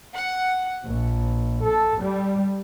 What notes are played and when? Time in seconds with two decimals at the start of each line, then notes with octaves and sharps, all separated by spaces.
0.14 F#5
0.85 A#1
1.64 A4
2.02 G3